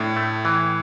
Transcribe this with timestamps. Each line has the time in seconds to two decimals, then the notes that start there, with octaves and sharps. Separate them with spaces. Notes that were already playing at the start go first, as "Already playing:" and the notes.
Already playing: A2 D4
0.16 A3
0.45 E3